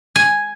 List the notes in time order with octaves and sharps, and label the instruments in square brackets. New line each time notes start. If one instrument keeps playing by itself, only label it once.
[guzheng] G#5